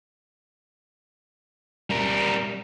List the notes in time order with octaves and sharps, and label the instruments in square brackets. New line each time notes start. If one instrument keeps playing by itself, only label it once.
[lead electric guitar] G3 A#4